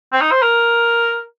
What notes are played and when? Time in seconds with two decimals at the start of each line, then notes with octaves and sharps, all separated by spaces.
0.13 C4
0.21 D#4
0.31 C5
0.42 A#4